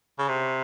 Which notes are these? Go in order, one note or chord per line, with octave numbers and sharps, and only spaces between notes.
C#3
C3